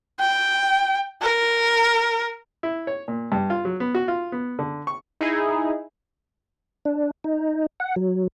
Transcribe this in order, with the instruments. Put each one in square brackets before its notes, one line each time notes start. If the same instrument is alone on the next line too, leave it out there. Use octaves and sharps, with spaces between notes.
[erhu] G5
A#4
[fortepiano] E4
C#5
A#2
G2
F4
F#3
B3
F#4
F4
B3
D3
C#6
[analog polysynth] D#4 E4 G#4
[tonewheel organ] D4
D#4
F#5
F#3